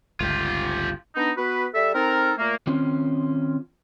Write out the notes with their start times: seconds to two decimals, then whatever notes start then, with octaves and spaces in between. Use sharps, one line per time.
0.20 G1 C#2 F4 G4
1.15 B3 D4 D#4
1.36 B3 F#4 B4
1.73 G3 A4 E5
1.94 C4 D#4 A4 A#4
2.38 A#2 A3 A#3
2.67 D#3 C4 C#4 F4